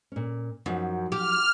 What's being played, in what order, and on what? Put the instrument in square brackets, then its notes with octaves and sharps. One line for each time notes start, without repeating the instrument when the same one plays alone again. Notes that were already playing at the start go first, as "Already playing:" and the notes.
[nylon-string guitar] A#2 C#4
[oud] F#2 [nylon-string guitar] F3 F#3 D#4
[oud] G4 [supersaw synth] F6